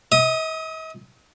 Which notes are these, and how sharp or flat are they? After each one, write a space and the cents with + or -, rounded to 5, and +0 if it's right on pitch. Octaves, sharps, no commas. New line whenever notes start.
D#5 +45 D#6 +0